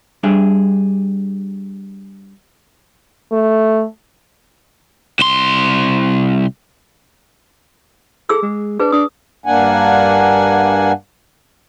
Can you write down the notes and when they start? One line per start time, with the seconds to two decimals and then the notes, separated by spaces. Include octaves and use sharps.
0.23 G3 D4 G#4 E5
3.32 A3
5.19 C2 C6
8.29 G#4 A4 E6
8.42 G#3
8.79 D4 G#4 B4
8.92 D4 D#6
9.46 G2 A#3 D4 F#5 G#5